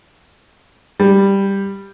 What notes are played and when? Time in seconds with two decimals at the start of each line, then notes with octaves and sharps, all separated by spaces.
1.00 G3